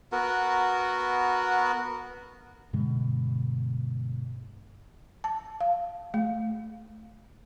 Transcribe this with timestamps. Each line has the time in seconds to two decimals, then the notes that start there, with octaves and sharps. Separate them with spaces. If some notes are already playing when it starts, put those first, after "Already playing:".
0.12 B3 F#4 A#4
2.73 G2 B2 D3 G#3
5.24 A5
5.61 F5
6.14 A3